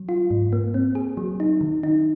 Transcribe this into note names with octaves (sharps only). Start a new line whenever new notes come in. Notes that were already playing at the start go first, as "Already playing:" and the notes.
Already playing: F#3
F4
G#2
A#3
C4
G#4
F#3
D#4
D#3
D#4